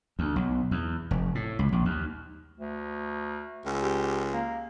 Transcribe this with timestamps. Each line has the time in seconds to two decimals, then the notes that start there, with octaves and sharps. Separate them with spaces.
0.19 D2
0.36 B1
0.71 E2
1.11 F1
1.35 A2
1.59 C#2
1.72 A#1
1.85 D#2
2.59 D2
3.65 C#2
3.82 G4
4.33 A#3